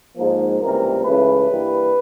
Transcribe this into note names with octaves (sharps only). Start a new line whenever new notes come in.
G#2 F3 A#3
C#2 C3 E3 G3 A#3 A#4
C#2 C#3 E3 A3 B4
G2 E3 G3 A#3